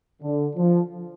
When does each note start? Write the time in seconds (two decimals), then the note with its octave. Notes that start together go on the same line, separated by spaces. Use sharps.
0.22 D3
0.56 F3